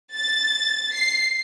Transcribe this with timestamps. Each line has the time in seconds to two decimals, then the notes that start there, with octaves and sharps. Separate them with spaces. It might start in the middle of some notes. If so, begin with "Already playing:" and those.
0.16 A6
0.95 C7